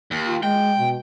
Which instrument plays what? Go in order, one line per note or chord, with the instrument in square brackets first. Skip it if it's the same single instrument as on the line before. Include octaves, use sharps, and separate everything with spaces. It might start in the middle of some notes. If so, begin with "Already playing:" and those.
[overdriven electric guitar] D#2
[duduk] F4
[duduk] G#3 [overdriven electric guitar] G5
[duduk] B2